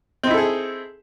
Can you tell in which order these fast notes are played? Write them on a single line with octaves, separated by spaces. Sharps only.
C4 D#4 E4 A4 G#4